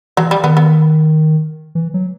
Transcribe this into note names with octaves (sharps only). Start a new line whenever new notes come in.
E3 F#3
G3
D#3 B3
B3
E3
F#3